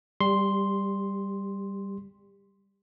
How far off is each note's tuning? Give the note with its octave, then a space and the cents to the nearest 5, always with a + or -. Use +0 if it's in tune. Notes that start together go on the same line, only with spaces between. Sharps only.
G3 +0 G4 +30 C6 +0